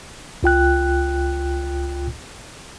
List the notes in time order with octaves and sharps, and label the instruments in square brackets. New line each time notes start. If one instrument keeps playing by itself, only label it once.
[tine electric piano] C#2 F4 G5 F#6